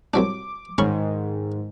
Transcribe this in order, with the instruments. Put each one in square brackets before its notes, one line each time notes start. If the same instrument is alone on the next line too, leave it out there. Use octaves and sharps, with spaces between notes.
[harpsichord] C2 F#3 D4 [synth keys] D6
[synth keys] G#2 D#3 [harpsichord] C#4 B5 C#6